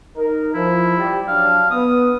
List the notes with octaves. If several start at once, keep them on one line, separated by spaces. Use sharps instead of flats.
D#4 A#4
F3 E4
G3
F#3 D4 F5
B3 D#6